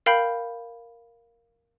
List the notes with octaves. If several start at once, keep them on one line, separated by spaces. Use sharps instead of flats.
A#4 F5 G5 B5 G6